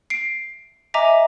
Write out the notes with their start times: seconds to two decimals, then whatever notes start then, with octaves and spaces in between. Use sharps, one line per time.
0.10 C7 D7
0.94 D#5 E5 G#5 A#5 D6